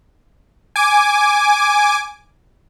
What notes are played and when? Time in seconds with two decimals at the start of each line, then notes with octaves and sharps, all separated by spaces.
0.76 G#5 D6